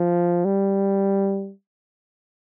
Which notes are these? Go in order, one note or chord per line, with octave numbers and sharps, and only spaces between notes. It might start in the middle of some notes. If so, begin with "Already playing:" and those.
Already playing: F3
G3